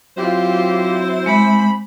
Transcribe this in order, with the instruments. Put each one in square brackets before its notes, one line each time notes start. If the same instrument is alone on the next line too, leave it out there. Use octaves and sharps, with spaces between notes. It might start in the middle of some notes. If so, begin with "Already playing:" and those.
[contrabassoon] F#3 [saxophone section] C4 E4 C5 [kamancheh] F4 G4
[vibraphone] G#3 [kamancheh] B5